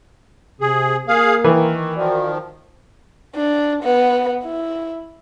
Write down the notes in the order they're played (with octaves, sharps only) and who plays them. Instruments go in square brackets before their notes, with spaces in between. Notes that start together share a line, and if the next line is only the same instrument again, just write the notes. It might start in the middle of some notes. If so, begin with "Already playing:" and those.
[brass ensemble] C3 [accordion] G#4
[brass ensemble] A#3 A#4 [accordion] G#4 F5
[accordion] D#3 [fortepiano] E3
[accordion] D#3 F3 [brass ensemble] F#4 A#4 D5
[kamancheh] D4
B3
E4